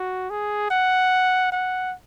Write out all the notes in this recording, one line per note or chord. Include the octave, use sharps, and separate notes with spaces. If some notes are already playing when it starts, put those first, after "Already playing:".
Already playing: F#4
G#4
F#5
F#5